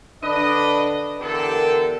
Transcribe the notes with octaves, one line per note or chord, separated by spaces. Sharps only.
D3 D4 B4 D#5
D3 E3 B3 G4 A4 A#4